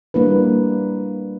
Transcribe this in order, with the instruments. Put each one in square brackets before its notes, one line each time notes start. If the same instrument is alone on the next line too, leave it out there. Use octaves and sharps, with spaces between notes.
[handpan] G3 A#3 D4 E4 B4